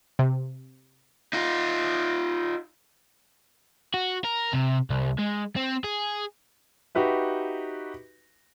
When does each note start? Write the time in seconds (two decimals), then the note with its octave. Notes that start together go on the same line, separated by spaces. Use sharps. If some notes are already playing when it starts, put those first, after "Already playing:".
0.19 C3
1.33 D#4 F4
3.94 F#4
4.24 A#4
4.53 C3
4.90 C2
5.19 G#3
5.56 C4
5.84 G#4
6.95 D#4 F#4 G4 B4 E5